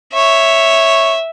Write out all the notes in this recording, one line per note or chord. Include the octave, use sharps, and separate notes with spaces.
C#5 E5